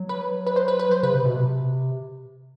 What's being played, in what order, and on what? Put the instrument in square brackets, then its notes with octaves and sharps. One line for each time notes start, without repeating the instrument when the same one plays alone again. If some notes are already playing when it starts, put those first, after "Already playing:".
Already playing: [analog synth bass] F#3
[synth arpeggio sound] B4
B4
C5
B4
B4
C5
[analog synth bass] C#3 [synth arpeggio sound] B4
[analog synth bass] C3
B2
C3